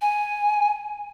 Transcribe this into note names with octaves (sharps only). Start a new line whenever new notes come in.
G#5